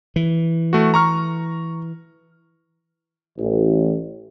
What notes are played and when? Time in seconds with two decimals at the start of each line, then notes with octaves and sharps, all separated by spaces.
0.16 E3
0.73 A3 F#4
0.94 A#5 C#6 F6
3.37 A1